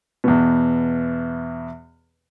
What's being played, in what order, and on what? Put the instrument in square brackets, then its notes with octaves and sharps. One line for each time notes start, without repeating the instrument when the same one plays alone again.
[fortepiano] E2 B2